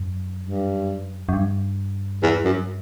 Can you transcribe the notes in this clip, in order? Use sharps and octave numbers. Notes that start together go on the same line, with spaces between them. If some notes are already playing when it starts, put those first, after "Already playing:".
Already playing: F#2
G2
F#2
G2
E2
F#2